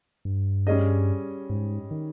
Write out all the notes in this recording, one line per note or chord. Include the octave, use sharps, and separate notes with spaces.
G2
G3 C#4 G#4 D#5
G#2
D#3